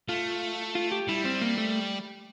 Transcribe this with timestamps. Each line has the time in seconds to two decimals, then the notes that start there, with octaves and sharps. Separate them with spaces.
0.09 A3 F4
0.75 F4
0.91 G4
1.09 G3 E4
1.25 C4
1.41 A#3
1.58 A3